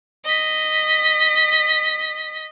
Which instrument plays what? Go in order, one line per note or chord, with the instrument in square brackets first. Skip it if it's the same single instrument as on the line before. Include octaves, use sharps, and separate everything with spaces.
[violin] D#5 B6